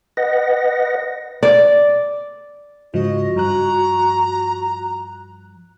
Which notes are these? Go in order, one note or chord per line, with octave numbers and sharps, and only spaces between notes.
B4 D#5 F#5 A#6
D5
G#2 C#3 F3 F#4 D#5
G2 F3 A#5 F#6